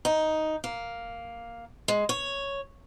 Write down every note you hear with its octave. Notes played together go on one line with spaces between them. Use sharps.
D#4
A#3
G#3
C#5